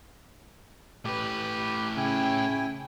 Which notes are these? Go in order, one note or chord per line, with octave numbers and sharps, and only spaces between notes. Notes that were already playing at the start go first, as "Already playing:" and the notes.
A2 G4 B4
C#3 E4 G5 G#5